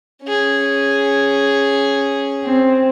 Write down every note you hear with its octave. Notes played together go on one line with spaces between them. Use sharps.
C#4 G#4
C4